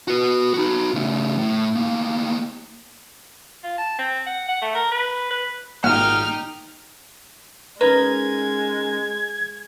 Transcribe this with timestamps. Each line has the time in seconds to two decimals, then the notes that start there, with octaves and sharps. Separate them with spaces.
0.08 F#4 B4
0.54 D#4 F#4
0.94 C#3 A3
1.38 A2
1.75 D2 A#3
3.63 F4
3.78 A5
3.98 C4
4.26 F#5
4.48 F#5
4.62 A3
4.75 A#4
4.92 B4
5.31 B4
5.84 G#1 A#2 D#4 G4 F#5 F6
7.81 G#3 C#4 D#4 A#4 B4 G#6